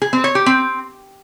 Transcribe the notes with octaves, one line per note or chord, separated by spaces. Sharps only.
G#4
C4
C#5
G4
C4